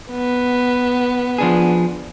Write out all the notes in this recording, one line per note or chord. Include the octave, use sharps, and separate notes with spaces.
B3
F3 D4 G#4